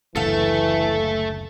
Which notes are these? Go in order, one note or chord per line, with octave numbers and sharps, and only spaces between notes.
F#1 D2 E3 A3 A4 F5